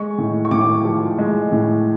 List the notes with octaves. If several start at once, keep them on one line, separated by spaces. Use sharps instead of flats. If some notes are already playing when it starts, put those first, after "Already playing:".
Already playing: G#3 C#6
A2
C#6
A2 D6
F3
G#3
A2